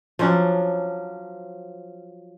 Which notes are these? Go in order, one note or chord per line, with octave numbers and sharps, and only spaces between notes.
F3 F#3 C#4 D4